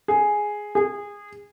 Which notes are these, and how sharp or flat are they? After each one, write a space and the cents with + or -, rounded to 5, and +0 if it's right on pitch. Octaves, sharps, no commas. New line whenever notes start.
G#4 +0
G#4 -25